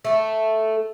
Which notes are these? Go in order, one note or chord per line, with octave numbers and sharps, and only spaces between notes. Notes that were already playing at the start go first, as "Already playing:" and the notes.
A3 A4